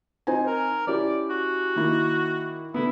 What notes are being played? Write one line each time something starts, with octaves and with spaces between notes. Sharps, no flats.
C4 D#4 G#5
A#4
C#4 E4 G4 D5
F#4
D#3 A#3 E4
D3 B3 E4